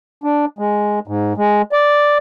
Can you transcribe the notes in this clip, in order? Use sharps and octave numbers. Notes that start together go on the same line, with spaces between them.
D4
G#3
G#2
G#3
D5